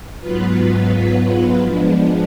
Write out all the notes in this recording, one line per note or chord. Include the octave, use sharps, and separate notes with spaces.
G#2 F#3 B3 F4 B4
F3 G#3 B3 D4